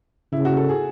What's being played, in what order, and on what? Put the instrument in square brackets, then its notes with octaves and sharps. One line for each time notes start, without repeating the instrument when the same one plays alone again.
[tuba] C#3 [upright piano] E4
[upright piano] F#4
A4
G#4